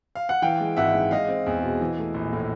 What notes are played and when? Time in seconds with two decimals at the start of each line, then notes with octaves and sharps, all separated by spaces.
0.15 F5
0.29 F#5
0.42 E3 F5 G5
0.60 G#3
0.77 G#1 E5 F#5
0.94 G#2
1.11 G#3 D#5 F5
1.29 C4
1.46 E2
1.63 B2
1.81 E3
1.98 A3
2.14 A#1
2.33 A2